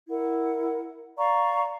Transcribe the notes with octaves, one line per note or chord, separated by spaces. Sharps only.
E4 A#4 F#5
D5 F5 A#5 C#6